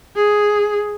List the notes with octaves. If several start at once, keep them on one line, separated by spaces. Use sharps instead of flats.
G#4